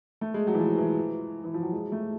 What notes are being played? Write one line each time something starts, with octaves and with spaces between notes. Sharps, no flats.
A3
G#3
F#3
E3
F3
E3
E3
F3
F#3
G#3
A3